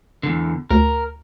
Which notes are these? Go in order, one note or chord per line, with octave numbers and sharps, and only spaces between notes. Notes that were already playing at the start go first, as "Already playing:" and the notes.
E2 D3
D2 A#4